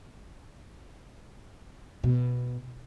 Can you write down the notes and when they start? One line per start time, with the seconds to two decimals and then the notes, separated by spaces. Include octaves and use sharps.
2.04 B2